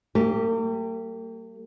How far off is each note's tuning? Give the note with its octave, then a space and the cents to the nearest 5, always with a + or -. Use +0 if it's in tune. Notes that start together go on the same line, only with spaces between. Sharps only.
G3 -45 A#3 -45 G4 +0